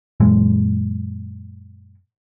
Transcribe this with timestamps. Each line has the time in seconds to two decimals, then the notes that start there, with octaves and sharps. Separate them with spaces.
0.20 F#2 A#2 E3 G#3